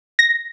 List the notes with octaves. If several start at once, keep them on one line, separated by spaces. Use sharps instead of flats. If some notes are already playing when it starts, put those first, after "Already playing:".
A#6